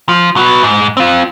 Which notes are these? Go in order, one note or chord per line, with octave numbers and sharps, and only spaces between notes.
F3
F#3 B3
G#2
C4 F4